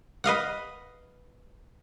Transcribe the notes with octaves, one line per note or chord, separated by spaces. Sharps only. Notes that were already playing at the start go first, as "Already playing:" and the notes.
B4 D#5 F5 F#5